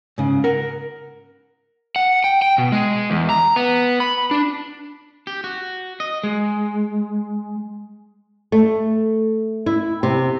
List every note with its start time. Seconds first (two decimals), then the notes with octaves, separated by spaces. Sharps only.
0.18 G#2 C#3
0.44 A#4 F#5
1.96 F#5
2.24 G5
2.42 G5
2.58 B2
2.72 G#3
3.10 E2
3.29 A#5
3.56 B3
4.00 B5
4.31 D4
5.27 G4
5.44 F#4
6.00 D#5
6.23 G#3
8.52 A3
9.66 E4
10.03 C3